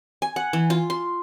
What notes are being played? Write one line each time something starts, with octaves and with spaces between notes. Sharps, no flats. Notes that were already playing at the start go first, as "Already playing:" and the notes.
G#5
F#5
E3
F4
C6